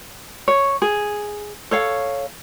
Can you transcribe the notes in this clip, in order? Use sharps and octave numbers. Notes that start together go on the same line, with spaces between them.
C#5
G#4
A4 C#5 F5